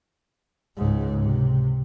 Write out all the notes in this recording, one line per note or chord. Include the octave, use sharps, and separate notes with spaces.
C#2 G#2
C3